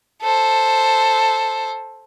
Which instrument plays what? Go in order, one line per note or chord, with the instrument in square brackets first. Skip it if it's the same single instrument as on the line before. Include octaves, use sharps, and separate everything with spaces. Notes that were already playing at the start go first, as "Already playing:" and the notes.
[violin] A4 C5